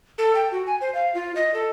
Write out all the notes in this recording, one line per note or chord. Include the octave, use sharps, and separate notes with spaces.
A4
G5
F#4
G#5
C5
F5
F4
D#5
A4